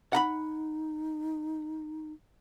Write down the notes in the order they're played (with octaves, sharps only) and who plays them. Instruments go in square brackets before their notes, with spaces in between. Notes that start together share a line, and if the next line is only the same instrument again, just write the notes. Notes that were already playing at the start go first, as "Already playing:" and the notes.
[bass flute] D#4 [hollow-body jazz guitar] F#5 A#5 B5